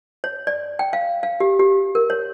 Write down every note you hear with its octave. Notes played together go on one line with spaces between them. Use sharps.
C#5
D5
G5
F5
F5
G4
G4
A#4
C#5